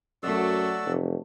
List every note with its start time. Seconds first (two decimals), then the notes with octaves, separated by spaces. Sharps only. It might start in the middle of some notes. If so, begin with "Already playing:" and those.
0.23 F#2 F#3 A3 F#4 D5 E6
0.85 F1